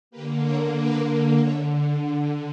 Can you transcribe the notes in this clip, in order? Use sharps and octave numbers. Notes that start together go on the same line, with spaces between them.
D3 A#3 G4 B4
A#4 C#5
B4 D5
D3 C#5 E5